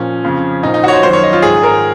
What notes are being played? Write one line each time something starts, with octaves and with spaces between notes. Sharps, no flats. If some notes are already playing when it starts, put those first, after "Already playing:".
Already playing: A#2 F3 C#4
F2 C#3 F3
A#2 F3 D#4
D#4
F#4 C#5
C5
F#2 D#3 C5
C#5
D#5
F4
G#2 D#3 G#4
A#4